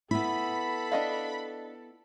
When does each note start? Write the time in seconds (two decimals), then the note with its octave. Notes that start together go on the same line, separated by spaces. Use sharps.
0.11 B3 E4 A4 B5
0.92 D4 D#5 F5